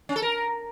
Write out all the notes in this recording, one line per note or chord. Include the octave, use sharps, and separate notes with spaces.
C#4
A4
A#4